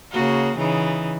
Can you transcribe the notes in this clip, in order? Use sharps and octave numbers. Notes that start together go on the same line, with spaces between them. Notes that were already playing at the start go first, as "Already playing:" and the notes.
C#3 A#3 F#4
C#3 E3 D#4